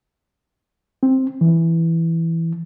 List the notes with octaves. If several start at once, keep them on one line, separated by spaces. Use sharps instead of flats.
C4
E3